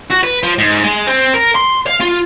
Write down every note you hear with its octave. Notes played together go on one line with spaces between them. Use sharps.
F#4
B4
F3
G#2
G#3
C4
A#4
C6
F5
F4